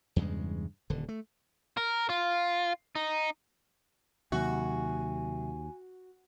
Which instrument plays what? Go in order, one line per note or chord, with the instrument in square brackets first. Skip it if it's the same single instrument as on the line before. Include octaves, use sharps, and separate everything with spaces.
[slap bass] E2 G2 C#3 G#3
D#1 D3
A3
[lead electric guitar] A#4
F4
D#4
[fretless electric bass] D#2 [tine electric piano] C3 F#3 E5 [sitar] F#4 [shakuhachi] G#5